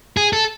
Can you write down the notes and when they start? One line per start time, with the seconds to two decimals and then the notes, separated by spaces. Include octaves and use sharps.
0.17 G#4
0.33 A4